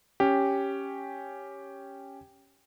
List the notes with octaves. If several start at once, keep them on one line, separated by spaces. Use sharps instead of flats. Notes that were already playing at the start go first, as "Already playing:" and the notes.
C#4 G4